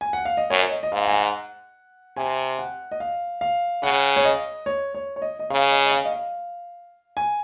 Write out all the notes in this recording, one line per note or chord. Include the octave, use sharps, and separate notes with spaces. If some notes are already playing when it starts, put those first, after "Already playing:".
G#5
F#5
F5
D#5
F#2 C#5
C#5
D#5
D#5
G#2 F5
G#5
F#5
C3 G#5
F#5
D#5
F5
F5
C#3 F#5
C#5
D#5
C#5
C#5
C#5
D#5
D#5
C#3 F5
D#5
D#5
F5
D#5
F5
G#5